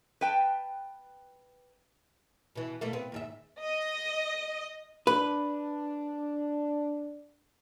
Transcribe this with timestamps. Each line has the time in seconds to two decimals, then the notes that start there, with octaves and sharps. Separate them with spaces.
0.21 B4 G5 A5
2.55 B2 E3
2.81 B2 A3 A#3
2.93 B3 C4
3.12 D#2 G#2 E5
3.62 D#5 D#6
5.07 D4 B4